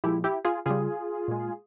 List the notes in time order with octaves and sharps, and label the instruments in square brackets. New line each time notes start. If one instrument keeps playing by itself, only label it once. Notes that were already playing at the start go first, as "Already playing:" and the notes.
[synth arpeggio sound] A#2 F3 G#3 E4 G4
E4 G4
F4 G#4
C#3 G3 F4 G#4
A#2 G#3